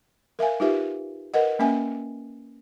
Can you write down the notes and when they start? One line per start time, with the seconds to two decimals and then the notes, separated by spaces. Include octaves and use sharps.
0.39 A#4 E5 F5 G#5
0.60 D#4 F4 G4 B4 E5
1.34 A#4 B4 D#5 F#5
1.59 A#3 C#4 E5 G#5